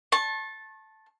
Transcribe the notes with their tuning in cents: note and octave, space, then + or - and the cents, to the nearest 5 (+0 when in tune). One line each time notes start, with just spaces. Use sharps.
A5 -5 C#6 -40